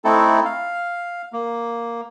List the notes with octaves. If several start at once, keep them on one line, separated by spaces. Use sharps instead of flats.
A3 C4 D#4 E4 A4
F5
A#3